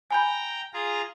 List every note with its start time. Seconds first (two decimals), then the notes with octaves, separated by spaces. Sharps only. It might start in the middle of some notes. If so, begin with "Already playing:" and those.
0.11 G5 G#5 A#5 B5 G6
0.73 F4 G#4 A#5